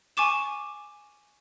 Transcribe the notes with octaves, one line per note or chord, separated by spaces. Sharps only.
G#5 C#6 D6 E7